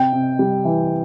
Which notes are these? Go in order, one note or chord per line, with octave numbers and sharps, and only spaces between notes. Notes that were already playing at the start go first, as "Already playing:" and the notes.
Already playing: C3 G5
C3
G3
E3